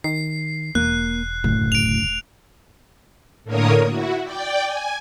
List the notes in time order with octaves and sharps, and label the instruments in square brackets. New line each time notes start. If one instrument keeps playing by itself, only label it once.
[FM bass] D#3 [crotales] C7
[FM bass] E1 [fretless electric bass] A#3 [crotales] F#6
[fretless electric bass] F#1 D2 [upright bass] A2
[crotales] D7 F7
[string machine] A2 D3 A#3 A#4 C#5 D#6
E4 F#4
D5 G5
G#5